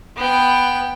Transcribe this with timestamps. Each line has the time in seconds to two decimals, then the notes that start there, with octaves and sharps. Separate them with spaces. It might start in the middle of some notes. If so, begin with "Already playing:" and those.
0.17 B3 G5